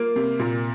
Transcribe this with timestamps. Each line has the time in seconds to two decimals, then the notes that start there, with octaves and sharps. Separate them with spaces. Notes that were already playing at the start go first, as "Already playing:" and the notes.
Already playing: A#3 F4
0.16 C3
0.39 A#2